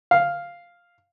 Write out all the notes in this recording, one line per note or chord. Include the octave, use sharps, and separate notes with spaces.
F5